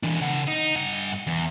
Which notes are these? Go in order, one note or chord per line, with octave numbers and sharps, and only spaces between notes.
E3 D4
C#3 F#5
D#4
G2 F#5
E2